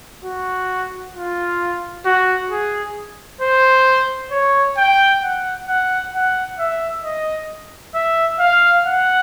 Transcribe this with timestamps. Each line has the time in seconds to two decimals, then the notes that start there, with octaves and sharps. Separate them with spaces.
0.25 F#4
1.15 F4
2.06 F#4
2.51 G#4
3.41 C5
4.32 C#5
4.77 G5
5.23 F#5
5.68 F#5
6.14 F#5
6.59 E5
7.04 D#5
7.95 E5
8.39 F5
8.85 F#5